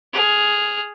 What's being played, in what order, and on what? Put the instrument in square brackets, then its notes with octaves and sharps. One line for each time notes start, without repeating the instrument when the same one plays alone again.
[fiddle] G#4 F6